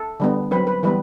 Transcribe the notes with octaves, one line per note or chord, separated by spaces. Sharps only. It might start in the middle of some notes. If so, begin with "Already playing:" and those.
Already playing: A4
D3 G3 B3
F#3 C4 B4
B4
E3 G3 B3 B4